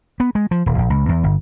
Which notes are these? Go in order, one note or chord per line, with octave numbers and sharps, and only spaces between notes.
B3
G#3
F3
D#1
A#1
C#2
E2
G1